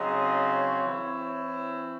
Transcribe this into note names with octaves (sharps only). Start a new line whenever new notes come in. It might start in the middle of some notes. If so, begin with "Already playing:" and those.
Already playing: C#3 F#3 C4 D#4 D#5
C#5
E3 C4 E4
C#5